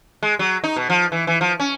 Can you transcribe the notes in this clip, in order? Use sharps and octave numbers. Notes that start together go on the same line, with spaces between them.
G#3
F#3
D#4
B2
F3
E3
E3
F3
C#4